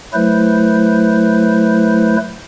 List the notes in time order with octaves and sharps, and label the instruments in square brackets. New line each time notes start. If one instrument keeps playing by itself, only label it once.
[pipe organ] F#3 A3 E4 B4 C5